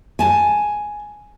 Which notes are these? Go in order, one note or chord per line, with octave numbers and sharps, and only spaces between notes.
G#5 A5